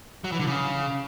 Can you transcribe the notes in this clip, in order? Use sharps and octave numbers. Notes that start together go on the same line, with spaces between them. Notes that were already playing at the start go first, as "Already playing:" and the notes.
F#3
E3
D3
C#3